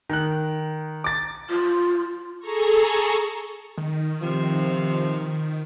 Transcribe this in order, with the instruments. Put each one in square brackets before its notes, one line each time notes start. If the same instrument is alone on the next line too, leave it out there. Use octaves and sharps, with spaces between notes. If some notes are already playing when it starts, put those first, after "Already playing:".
[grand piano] D#3 F#6
D6 A6
[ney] F4
[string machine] G#4 A4 A#5 C#6
[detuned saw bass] D#3
[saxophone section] C3 F3